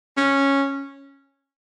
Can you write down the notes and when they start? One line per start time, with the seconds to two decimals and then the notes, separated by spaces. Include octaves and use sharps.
0.17 C#4